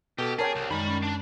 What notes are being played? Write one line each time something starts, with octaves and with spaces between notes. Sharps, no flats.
B2 G4 A4
G#4 A#4 C#5 G5 A5
C2
F#2 D#3 G#3 D5 B5
F#2 G#3 C#4
D4